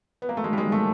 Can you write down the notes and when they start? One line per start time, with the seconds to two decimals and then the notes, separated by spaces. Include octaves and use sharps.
0.22 B3
0.29 A#3
0.37 A3
0.44 D#3 F#3 G#3 A#3
0.53 G3
0.58 G#3
0.72 A3